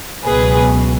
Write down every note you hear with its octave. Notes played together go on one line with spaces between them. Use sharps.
C#2 B2 F#3 G#4 B4